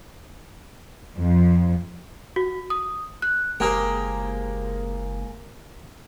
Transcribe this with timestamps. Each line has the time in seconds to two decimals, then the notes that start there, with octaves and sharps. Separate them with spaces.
1.17 F2
2.36 F#4
2.70 D#6
3.22 F#6
3.60 F#1 G#3 A#3 G4 G#4 A#4 C5